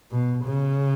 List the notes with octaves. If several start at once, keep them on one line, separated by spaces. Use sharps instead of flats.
B2
C#3